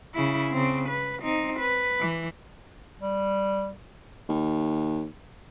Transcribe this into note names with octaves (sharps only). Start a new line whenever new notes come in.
C#3 E4
C#3 C4
B4
C4 D#4
B4
E3
G3
D#2